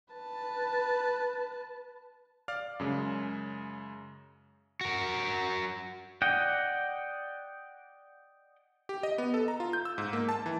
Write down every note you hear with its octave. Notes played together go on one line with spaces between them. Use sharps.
B4 A5
D5 F5 F6
F#2 C#3 G#3
F#4 A#4
D5 D#5 F#5 G5
G4
D#5
B3
A4
A#5
F4
G6
E6
G#2
A#3
A5
E3